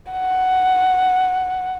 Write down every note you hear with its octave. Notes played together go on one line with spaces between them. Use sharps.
F#5